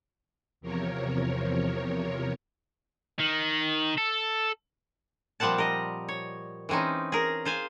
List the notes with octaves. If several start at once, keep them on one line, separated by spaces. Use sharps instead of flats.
E2 C3 F3 A#4 C#5
D#3
A4
A#2 F3 G3 C4 F#5 A5
A#4 D#5
C#5
E3 G#3 C4 C#4 D#4
G#4 A#4
F4 C5 F5 G#5